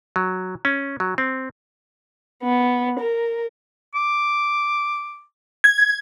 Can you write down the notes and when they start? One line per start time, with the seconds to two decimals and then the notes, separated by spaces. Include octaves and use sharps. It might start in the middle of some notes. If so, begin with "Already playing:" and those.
0.16 F#3
0.65 C#4
1.00 F#3
1.18 C4
2.43 B3
3.00 A#4
3.95 D6
5.64 G#6